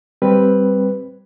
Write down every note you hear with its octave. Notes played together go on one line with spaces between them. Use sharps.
G3 C4 B4